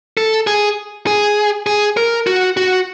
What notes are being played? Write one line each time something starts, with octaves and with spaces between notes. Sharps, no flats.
A4
G#4
G#4
G#4
A#4
F#4
F#4